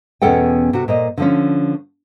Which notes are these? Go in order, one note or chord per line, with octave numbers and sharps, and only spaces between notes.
E2 B2 C#4 A4 F#5 G5
C3 F#4
A#2 C5 D#5
D3 F3 C#4